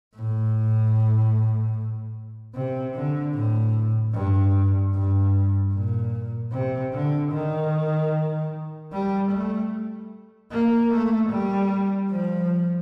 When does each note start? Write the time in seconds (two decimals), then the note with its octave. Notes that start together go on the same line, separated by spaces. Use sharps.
0.15 A2
2.55 C3
2.94 D3
3.34 A2
4.14 G2
4.94 G2
5.74 A#2
6.53 C3
6.93 D3
7.32 D#3
8.92 G3
9.32 A3
10.52 A#3
10.91 A3
11.31 G3
12.11 F3